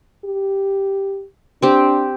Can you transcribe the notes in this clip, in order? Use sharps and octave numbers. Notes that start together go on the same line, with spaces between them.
G4
C4 D4 G4